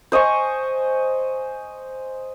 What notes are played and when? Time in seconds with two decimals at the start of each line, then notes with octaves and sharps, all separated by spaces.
0.12 C5 D#5 G#5 C#6